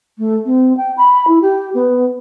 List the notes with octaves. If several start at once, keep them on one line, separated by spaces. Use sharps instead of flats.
A3
C4
G5
B5
E4
G4
B3